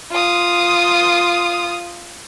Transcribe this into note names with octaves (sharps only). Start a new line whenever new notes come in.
F4 D#6